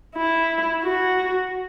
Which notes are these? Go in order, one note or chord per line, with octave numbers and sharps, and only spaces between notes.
E4
F#4